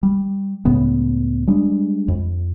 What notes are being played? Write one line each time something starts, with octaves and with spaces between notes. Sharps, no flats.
G3
C#2 A2 C#3 B3
G3 G#3 D4
F2